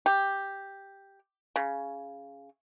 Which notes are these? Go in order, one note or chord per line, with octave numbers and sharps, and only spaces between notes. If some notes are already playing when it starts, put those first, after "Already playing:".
G4
C#3